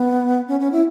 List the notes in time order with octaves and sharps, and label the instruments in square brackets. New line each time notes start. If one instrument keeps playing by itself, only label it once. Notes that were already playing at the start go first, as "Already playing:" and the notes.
Already playing: [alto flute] B3
C#4
C#4
E4